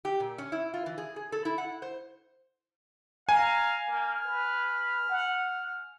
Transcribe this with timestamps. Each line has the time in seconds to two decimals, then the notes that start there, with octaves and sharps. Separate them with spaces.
0.05 G4
0.20 A#2
0.38 C#4
0.52 E4
0.74 F4
0.86 E3
0.98 G#4
1.16 G#4
1.32 A4
1.45 E4
1.58 F#5
1.82 C5
3.29 F5 G#5 A#5
3.88 A#3 F6
4.24 B4
5.09 F#5